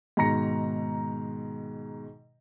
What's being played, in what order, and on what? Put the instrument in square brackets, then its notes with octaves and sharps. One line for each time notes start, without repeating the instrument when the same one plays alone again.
[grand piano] G#2 B2 D#3 A#5 A#6 C#7